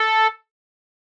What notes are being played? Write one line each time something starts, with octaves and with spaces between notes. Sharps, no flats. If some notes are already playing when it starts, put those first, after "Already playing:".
Already playing: A4